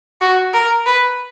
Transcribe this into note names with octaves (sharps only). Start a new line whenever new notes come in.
F#4
A#4
B4